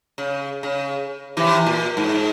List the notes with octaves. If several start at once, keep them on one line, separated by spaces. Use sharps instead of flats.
C#3
C#3
C3 E3
A#2
G#2